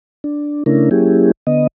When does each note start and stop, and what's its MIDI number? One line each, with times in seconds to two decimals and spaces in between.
0.24 0.63 62
0.66 0.89 49
0.66 0.89 57
0.66 0.89 61
0.66 0.89 62
0.66 0.89 64
0.66 0.89 70
0.91 1.31 54
0.91 1.31 58
0.91 1.31 61
0.91 1.31 64
0.91 1.31 67
0.91 1.31 68
1.47 1.67 50
1.47 1.67 59
1.47 1.67 75